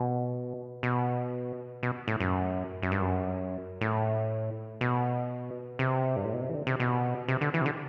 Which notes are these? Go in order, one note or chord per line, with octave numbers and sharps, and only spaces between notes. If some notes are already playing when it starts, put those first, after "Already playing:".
Already playing: B2
B2
B2
A2
F#2
F#2
G2
F#2
A2
B2
C3
G2
A2
B2
C3
E3
D3
C3
B2
C3
D3
E3
C3
D3